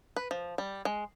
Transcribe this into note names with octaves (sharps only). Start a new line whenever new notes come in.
B4
F3
G3
G#3